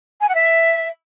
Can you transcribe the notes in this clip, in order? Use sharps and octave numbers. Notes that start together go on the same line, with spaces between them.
G#5
F#5
E5